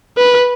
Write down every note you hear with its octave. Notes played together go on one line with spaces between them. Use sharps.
B4